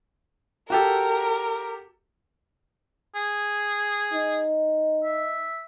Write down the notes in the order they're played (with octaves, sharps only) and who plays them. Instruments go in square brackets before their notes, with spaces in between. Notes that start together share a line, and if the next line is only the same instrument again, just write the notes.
[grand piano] F#4 G4 A4 [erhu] A#4
[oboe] G#4
[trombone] D#4
[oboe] E5